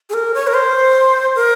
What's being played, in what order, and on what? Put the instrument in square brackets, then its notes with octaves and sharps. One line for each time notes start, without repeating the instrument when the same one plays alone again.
[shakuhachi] G#4
A#4
C#5
A#4
C5
A#4